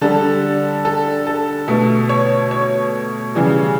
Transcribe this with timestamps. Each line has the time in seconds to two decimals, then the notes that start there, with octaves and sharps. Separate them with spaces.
0.01 D3 G3 A4
0.85 A4
1.27 A4
1.68 B2 A3
2.09 C#5
2.51 C#5
3.35 C#3 E3 G3